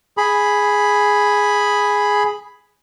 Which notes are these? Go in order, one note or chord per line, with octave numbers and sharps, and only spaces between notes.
G#4 B5